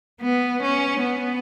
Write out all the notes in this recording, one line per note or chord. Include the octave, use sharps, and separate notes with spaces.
B3
C#4
B3